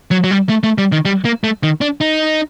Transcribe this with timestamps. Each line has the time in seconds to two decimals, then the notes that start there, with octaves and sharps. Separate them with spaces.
0.11 F#3
0.24 F#3
0.31 G3
0.49 A3
0.63 A3
0.78 G3
0.92 D#3
1.05 G3
1.25 A#3
1.44 A3
1.63 D#3
1.81 D4
2.01 D#4